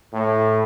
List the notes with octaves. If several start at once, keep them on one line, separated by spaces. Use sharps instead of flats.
A2